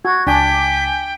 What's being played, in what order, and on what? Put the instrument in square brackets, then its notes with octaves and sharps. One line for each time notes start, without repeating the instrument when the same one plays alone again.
[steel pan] F#4 [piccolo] G#6
[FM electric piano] C#2 G#5 D6 [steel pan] D4 [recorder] G5 [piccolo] B6